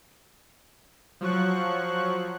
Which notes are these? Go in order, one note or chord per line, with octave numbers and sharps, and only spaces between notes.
F3 F#3 C#6 F#6